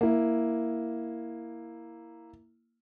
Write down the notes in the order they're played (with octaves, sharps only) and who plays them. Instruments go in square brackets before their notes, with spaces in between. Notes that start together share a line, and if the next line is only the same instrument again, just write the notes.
[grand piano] A#3 E4